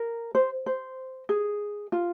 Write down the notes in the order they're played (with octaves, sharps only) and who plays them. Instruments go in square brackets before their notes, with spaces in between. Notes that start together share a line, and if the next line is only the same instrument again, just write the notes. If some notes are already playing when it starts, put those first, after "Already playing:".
Already playing: [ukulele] A#4
C5
C5
G#4
F4